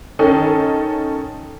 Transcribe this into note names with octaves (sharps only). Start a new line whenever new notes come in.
D#3 C#4 D#4 A4